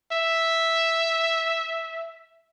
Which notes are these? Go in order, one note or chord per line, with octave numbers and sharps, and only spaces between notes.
E5